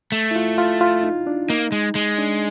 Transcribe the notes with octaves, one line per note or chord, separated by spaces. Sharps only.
A3
E4
F4
F4
F4
D#4
D4
A#3 D#4
G#3
G#3
D4